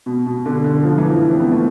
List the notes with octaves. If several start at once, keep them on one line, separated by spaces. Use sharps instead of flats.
B2
B2
D3
D3
F3
E3
F3
C4
B3
A3